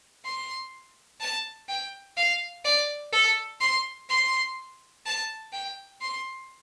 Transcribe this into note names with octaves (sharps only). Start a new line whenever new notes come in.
C6
A5
G5
F5
D5
A4
C6
C6
A5
G5
C6